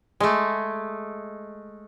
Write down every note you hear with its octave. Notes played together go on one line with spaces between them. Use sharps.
G#3 A3